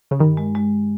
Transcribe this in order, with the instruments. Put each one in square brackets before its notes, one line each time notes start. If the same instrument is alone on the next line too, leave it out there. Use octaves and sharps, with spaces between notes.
[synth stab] C#3
[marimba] G2 [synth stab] D#3
[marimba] G#3
G#3